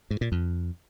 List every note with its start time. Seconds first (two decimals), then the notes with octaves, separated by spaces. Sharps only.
0.11 G#2
0.21 A#2
0.32 F2